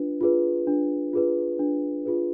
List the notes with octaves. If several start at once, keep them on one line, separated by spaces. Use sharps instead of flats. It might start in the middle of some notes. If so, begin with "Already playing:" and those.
Already playing: D4 F4 B4
F4 G#4 B4
D4
F4 G#4 B4
D4
F4 G#4 B4